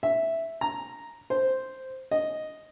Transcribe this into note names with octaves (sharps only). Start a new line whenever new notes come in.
E5
A#5
C5
D#5